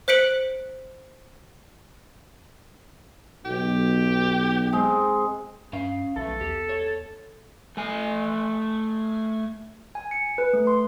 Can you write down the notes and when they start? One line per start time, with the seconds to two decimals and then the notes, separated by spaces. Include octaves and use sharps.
0.08 C5 F#6 B6 C#7 D7 F#7
3.45 B1 G4
4.73 G#3 C4
5.73 G2 C#4 F5
6.16 B1 E3 A3 A4
6.41 E2 G4
6.69 C#5
7.77 A3 G#5
9.95 G#5
10.11 C#7
10.38 B4
10.53 A3
10.67 C6